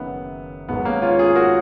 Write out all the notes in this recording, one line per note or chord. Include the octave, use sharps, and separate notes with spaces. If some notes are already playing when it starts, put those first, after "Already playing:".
Already playing: F#1 F#2 D#3 B3
G#1 G#2 F#3 B3
A#3 C#4
C#4 F4
F4 G#4
F#4 A#4